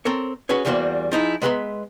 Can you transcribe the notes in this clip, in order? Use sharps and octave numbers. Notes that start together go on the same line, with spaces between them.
C4 A4 A#4 C#5
C#4 F#4 G#4 B4 C#5
E2 E3 G3 A#3 F#4 C5
F3 D#4 E4 G#4
G#3 B3 B4 E5 A#5 C6